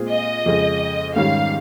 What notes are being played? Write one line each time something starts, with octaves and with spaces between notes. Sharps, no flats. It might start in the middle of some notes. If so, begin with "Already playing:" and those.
Already playing: A#2 G#3 C4 F4 G#4
D#5
F2 C#3 G#3
G#2 D#3 G3 C#4 G4 F5